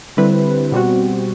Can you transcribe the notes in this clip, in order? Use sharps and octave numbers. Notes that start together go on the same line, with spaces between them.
D3 G3 C4 E4 B4
B2 G3 C4 F#4